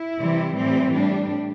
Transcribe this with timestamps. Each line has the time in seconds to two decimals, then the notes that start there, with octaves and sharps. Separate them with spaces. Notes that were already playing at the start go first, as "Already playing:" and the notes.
Already playing: E4
0.20 C3 E3 G3
0.56 A2 E3 G3 C4
0.94 A2 G3 D4